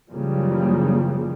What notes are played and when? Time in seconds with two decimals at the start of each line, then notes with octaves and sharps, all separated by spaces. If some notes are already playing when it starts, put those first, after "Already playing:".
0.11 F#1 C#3 E3 F3 G3 A#3